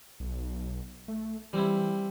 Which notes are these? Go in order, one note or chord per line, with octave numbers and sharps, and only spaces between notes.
B1
A3
E3 G3 C4 E4